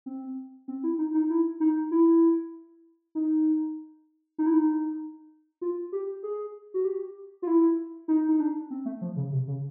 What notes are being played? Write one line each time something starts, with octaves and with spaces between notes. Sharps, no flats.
C4
C4
E4
D#4
D#4
E4
D#4
E4
D#4
D#4
E4
D#4
F4
G4
G#4
F#4
G4
F4
E4
D#4
D#4
D4
C4
A3
F3
C#3
C3
C#3